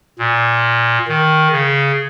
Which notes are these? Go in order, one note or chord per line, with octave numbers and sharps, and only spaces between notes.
A#2
D#3
C#3